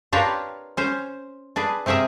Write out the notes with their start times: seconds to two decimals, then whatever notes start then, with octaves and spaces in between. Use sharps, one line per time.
0.13 D4 F4 G4 A#4 B4 C#5
0.77 C#4 C5
1.56 D4 G#4 B4
1.86 C3 G4 G#4 A#4 E5